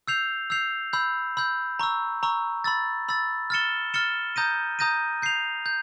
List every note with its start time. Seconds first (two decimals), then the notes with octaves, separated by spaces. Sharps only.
0.07 E6 G6 C7 F7
0.50 E6 G6 C7 F7
0.93 B5 E6 G6
1.37 B5 E6 G6
1.79 A#5 C#6 E6
2.23 A#5 C#6 E6
2.64 B5 E6 A6
3.08 B5 E6 A6
3.50 F6 A6 C#7 E7 G7
3.94 F6 A6 C#7 E7 G7
4.36 A#5 D#6 G6 A#6 D#7
4.79 A#5 D#6 G6 A#6 D#7
5.22 G6 C7 F7
5.66 G6